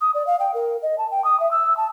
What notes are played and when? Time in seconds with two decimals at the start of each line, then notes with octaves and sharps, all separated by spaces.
0.01 D#6
0.14 D5
0.27 F5
0.39 G5
0.54 A#4
0.82 D#5
0.98 A5
1.11 G5
1.24 D#6
1.40 E5
1.51 E6
1.77 A5